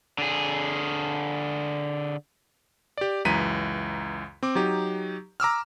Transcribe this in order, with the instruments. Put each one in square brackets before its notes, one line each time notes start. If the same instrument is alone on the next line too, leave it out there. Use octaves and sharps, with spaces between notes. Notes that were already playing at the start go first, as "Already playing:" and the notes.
[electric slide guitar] D3 G#4
[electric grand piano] G4 D5
C#2 F#2 E3 A#5 B6 D#7
C4 D6
F#3 D#4 G4
A#5 D6 E6 F6